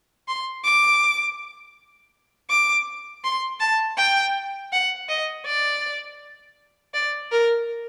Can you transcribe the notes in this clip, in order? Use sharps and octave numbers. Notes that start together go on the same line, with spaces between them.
C6
D6
D6
C6
A5
G5
F#5
D#5
D5
D5
A#4